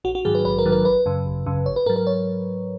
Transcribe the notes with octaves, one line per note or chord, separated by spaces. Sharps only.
A#1 F#4
F#4
G#2 D#3 F#3 G#4
B4
A#1 B4
A#4
G#2 D#3 F#3
A#4
G#1 B4
F#2 C#3
G#1
F#2 C#3
G#1 C#5
B4
G#2 F#3 A#4
A#4
C#5